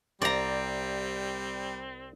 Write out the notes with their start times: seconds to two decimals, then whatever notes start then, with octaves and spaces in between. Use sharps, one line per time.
0.22 C2 G3 C4 D5 G5 A#5